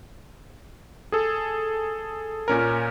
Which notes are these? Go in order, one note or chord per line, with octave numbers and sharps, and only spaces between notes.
G#4 A4
A#2 C#4 A#4